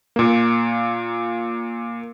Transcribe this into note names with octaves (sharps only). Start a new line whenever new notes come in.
A#2 A#3